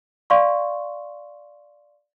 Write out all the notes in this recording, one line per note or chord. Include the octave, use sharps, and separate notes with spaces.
D5 F5 C6 C#6